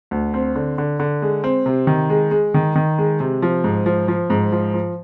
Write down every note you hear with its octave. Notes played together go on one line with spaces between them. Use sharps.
D2
C4
D3
D3
D3
G#3
C4
C3
D#3
G#3
G#3
D#3
D#3
G#3
C3
F3
G#2
F3
F3
G#2
F3
F3